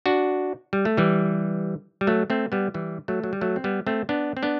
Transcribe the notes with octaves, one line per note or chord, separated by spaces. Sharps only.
D4 F#4
G3
A3
E3 G3
G3
F#3 A3
A3 C4
G3 B3
E3 G3
F#3 A3
F#3
G3
F#3 A3
C4
G3 B3
A3 C4
B3 D4
C4
B3 D4